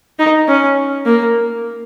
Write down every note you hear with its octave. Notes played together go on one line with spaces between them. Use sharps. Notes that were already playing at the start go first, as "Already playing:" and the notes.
D#4
C#4
A#3